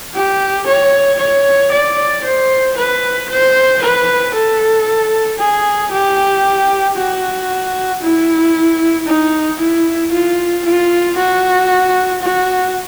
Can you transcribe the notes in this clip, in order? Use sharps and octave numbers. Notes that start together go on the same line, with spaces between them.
G4
C#5
C#5
D5
C5
B4
C5
B4
A4
G#4
G4
F#4
E4
D#4
E4
F4
F4
F#4
F#4